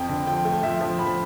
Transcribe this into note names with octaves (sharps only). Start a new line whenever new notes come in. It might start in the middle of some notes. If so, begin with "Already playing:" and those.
Already playing: F2 G5
D3
F3 G5
A3
F3 E5
F3
F3 B5